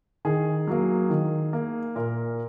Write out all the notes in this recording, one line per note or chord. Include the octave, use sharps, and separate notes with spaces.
D#3 G#4
F#3 A#3
D#3
A#3
A#2 A#4